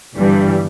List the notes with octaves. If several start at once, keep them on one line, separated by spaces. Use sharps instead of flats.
G1 G2 E3 G3